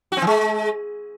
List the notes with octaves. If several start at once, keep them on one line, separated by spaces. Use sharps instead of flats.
F#4
C4
E3
G#3